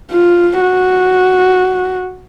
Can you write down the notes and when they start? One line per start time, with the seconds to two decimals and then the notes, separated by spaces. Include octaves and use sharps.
0.12 F4
0.61 F#4